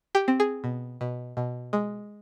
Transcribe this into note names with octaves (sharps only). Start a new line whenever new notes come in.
G4
C4
G#4
B2
B2
B2
G#3